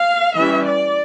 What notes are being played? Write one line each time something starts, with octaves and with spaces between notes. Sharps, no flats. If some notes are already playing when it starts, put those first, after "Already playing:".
Already playing: F5
E3 G3 C#4 E5
D5